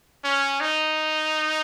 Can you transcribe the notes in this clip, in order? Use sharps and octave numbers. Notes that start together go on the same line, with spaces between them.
C#4
D#4